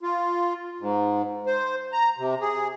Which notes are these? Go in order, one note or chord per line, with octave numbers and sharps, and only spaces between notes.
F4
G#2
C5
A#5
C3
G#4